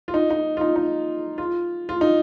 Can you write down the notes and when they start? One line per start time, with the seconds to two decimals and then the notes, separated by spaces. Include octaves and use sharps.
0.08 F4
0.14 D#4
0.30 D#4
0.57 F4
0.61 D#4
0.76 D#4
1.38 F4
1.89 F4
2.01 D#4